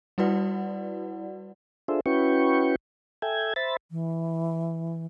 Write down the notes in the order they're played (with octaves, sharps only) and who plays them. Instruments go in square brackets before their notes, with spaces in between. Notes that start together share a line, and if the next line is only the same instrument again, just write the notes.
[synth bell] G3 E4 F#4 B4 D5 F#5
[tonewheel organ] D4 F4 G#4 A4 C5 E5
C#4 E4 F#4 B4 G5 C#6
A4 E5 G5 G#5 G#6
C5 E5 B5 A6
[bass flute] E3